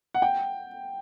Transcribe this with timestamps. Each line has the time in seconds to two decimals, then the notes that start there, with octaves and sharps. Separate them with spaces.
0.14 F#5
0.22 G5